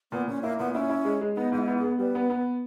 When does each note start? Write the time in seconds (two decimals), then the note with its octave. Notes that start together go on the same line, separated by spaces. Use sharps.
0.11 A#2 B3
0.28 A#2 C#4
0.43 A#3 E4
0.59 A#2 B3
0.74 C#4 E4
0.90 E4
1.05 G#3
1.21 G#3
1.36 B3 D#4
1.52 G#2 D#4
1.58 E4
1.67 B3
1.78 B3 G#4
1.99 G3 B4
2.15 B3
2.30 B3